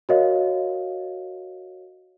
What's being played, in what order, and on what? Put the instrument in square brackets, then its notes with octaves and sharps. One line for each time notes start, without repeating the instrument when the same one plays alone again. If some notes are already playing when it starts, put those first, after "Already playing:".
[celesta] F#4 A#4 C#5 D#5 F5